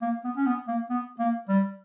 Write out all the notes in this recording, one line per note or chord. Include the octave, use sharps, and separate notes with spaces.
A#3
B3
C#4
B3
A#3
B3
A#3
G3